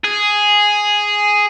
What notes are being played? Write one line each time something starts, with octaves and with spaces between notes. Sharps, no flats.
G#4